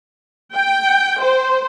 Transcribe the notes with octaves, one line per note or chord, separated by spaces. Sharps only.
G5
C5